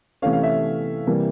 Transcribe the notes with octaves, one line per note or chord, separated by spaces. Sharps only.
C3 E3 A3 C#4 F5
F5
E5
C3 E3 G3 A#3